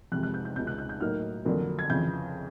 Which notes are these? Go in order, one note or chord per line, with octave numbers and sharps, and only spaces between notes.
F2 C3 E3 G#3 F#6
F#6
G6
G6
C#2 B2 G#3 G6
F#6
G6
G6
A2 F#3 A#3 D#4 F6
F2 D3 F#3 A#3
G#6
F2 C#3 E3 G6